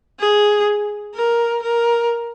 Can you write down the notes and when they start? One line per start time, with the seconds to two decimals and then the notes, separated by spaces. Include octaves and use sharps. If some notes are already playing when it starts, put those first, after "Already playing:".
0.20 G#4
1.15 A#4
1.63 A#4